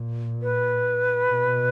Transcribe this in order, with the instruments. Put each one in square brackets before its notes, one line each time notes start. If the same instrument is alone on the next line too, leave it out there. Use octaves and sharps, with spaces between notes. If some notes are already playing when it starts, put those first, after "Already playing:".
Already playing: [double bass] A#2
[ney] B4
[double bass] B2